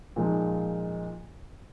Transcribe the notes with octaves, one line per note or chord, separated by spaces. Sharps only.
A#2 F3 G#3 D#4